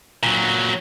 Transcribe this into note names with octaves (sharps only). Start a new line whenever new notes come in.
A#2 F#3